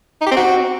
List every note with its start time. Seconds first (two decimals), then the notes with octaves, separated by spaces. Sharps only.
0.21 D#4
0.26 G4
0.31 C4
0.37 F#4